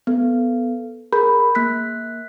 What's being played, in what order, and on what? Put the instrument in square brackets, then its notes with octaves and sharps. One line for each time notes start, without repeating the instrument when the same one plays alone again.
[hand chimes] B3 A4
G#4 A#4 B5 G6
A#3 F#6 B6